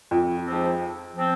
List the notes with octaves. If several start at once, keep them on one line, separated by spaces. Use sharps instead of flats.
F2
G#2 F3 C4
F3 C4